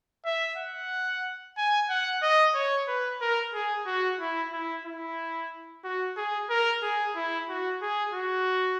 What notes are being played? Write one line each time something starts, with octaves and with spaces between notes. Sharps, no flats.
E5
F#5
G#5
F#5
D#5
C#5
B4
A#4
G#4
F#4
E4
E4
E4
F#4
G#4
A#4
G#4
E4
F#4
G#4
F#4